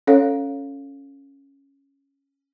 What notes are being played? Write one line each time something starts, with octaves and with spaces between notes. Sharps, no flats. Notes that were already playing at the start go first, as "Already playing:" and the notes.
C#4 A4 C#5 F5